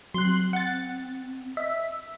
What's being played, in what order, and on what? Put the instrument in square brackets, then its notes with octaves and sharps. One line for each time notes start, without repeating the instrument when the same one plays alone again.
[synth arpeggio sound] F#3 [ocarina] C4 [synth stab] C6 F#6
[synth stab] F#5 A6
[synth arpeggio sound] D#5 [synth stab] E5